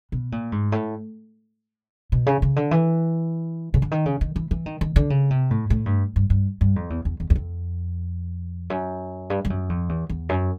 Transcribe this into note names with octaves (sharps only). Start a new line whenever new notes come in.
B2
A#2
G#2
A2
B2
C#3
C#3
D3
E3
C#3
D3
D#3
C#3
D#3
E3
E3
D#3
D#3
D3
C#3
C3
A2
A2
G2
G2
G2
G2
F2
E2
E2
E2
E2
F2
F#2
G2
G2
F#2
F2
E2
E2
F#2